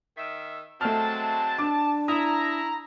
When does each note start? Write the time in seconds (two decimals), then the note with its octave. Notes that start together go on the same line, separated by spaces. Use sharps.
0.18 D#3 E5
0.81 F#3 G#3 A3 C4 A5 F6
1.58 D4 D6
2.08 E4 A#5 D#6